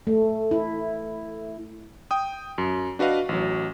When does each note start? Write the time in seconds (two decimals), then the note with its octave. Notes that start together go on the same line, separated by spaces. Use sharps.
0.07 A3
0.51 E4
2.11 G5 D#6
2.58 F#2
2.99 D4 F#4 B4 D#5 F5
3.29 A1 F#3